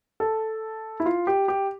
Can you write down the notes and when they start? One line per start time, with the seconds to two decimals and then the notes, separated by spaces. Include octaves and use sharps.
0.20 A4
1.00 E4
1.06 F4
1.27 G4
1.48 G4